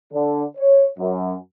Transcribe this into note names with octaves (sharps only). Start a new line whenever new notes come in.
D3
C#5
F#2